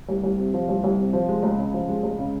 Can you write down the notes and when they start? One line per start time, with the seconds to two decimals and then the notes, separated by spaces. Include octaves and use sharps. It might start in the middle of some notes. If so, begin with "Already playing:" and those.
0.09 C2
0.23 C2
0.38 C3
0.54 F3
0.69 C2
0.84 C2
0.99 C3
1.13 F3
1.29 G#3
1.43 C#2
1.58 C#3
1.74 F3
1.88 G#3
2.03 C#2
2.18 C#3